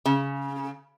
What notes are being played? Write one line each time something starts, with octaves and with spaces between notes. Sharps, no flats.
C#3